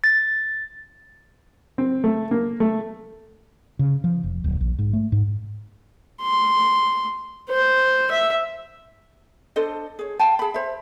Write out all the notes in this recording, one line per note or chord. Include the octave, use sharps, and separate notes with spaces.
A6
C4
A3
A#3
A3
C#3
F3
F1
D1
A#1
G#2
A3
G#2
C6
C5
E5
D4 A4 C5 D#5
G#4 C#5
F5 G5 A5
G#4 B5
C5 E5